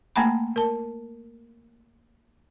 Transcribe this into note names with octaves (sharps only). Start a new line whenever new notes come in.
A3 A#3 F#5 G#5 A#5 B5
A#4 A5